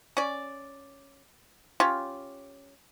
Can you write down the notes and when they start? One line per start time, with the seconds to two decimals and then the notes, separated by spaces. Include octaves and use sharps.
0.17 C#4 D5
1.80 C#4 F4 G4